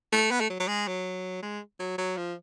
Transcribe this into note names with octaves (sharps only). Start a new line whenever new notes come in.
A3
B3
A3
F#3
F#3
G#3
F#3
G#3
F#3
F#3
F3